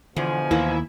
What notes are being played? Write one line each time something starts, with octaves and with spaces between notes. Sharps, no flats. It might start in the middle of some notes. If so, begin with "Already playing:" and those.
E2 B2 D3 F3 G#5
D#2 E3 A#3 E4